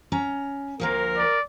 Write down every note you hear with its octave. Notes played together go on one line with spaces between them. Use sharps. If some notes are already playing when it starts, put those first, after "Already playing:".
C#4 A#5
D2 F3 A#3 A#4
D5